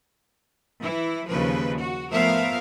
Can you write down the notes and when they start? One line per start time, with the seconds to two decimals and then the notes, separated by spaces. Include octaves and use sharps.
0.82 E3 E4
1.28 D#2 C#3 F3 B4
1.81 F#4
2.13 F3 A3 B3 A#4 E5 F5